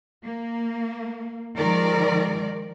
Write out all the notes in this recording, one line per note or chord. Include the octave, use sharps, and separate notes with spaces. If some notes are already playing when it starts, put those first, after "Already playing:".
A#3
D#3 F3 G#3 A#4 D5